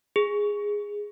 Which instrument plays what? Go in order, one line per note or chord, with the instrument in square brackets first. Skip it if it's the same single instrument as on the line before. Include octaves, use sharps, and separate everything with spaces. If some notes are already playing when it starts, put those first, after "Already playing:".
[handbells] G#4